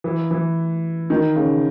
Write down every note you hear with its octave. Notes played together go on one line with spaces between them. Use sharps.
E3
E3
D#3
C#3